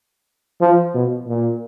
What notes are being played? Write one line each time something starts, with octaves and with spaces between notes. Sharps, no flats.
F3
B2
A#2